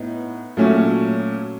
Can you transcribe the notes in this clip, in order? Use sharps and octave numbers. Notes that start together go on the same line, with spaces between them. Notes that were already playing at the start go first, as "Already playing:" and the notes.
Already playing: A2 B3 D#4
A#2 F#3 A3 C#4